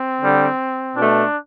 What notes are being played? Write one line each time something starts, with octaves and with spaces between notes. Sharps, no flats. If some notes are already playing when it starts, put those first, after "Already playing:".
Already playing: C4
D3 G3
B2 A3 D4